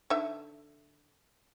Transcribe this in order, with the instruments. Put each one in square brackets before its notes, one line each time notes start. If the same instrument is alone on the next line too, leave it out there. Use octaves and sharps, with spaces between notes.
[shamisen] D3 D#4 E5